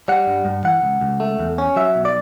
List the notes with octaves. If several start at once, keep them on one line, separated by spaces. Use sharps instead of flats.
G3 F#5
G2
G2
E3 F#5
C#2
C#2
A3
E2
C#4
F#3 E5
B1
D5